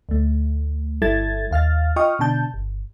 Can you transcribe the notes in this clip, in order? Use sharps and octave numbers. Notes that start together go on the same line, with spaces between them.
D2 A3
G1 G3 E4 A4 G#6 A6
D#2 F5 F6 A6
F4 D#5 G5 C#6 D#6 F6
B2 D3 D4 A5 G6
G1